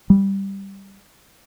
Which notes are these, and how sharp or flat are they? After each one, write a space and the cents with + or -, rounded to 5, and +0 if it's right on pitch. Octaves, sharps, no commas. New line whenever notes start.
G3 +0